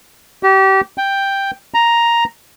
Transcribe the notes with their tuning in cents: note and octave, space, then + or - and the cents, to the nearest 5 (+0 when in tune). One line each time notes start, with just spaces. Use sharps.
G4 -30
G5 +5
A#5 +5